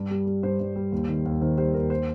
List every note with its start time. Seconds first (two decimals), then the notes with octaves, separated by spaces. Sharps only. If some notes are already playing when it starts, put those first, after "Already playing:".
Already playing: G2
0.11 G3
0.26 G3
0.43 G2 C5
0.60 G2
0.76 G3
0.92 D#2
1.08 D#3
1.25 D#2
1.41 D#3 C5
1.58 G3 C5
1.74 D#2 A#4
1.90 C5